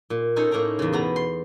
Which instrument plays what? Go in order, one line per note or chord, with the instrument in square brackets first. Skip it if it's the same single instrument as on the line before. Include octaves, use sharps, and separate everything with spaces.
[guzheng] A#2
C#4 D#4 A4 C5 C#5
A2 A#3 D#4 A#4 A#5
E2 C#3
B2 B3 A#5
C6